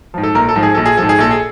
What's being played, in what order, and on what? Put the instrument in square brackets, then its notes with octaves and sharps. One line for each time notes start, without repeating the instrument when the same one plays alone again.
[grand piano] G#2 F3
A4
A#1 A#4
A4
G#2 F3
G#4
A#1 A4
G#4
G#2 F3 A4
G#4
A#1 A4
G#4